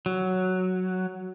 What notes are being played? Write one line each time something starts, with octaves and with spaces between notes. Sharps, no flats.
F#3